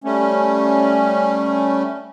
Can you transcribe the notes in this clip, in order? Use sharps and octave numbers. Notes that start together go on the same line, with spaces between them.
G3 A3 C#4